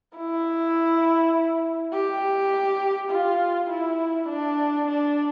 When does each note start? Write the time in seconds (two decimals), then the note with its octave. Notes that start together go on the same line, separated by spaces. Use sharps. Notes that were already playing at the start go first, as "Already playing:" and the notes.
0.16 E4
1.93 G4
3.10 F4
3.70 E4
4.29 D4
4.88 D4